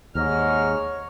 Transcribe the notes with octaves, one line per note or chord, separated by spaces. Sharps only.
D#2 G#2 C#5 D#5 A#5 F6